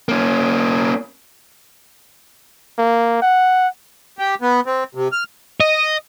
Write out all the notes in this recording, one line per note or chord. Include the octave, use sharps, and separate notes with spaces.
A#3 C#4
A#3
F#5
G4
B3
C4
C3
F6
D#5